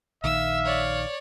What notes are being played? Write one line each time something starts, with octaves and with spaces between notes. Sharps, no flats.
A#1 D#3 E5 F5 E6
C#5 D5